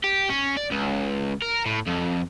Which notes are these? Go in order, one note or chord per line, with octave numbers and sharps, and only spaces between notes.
G4
C#4
D5
C#2
A#4
A2
F2